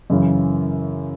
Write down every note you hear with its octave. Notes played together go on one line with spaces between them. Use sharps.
F#2 C#3 E3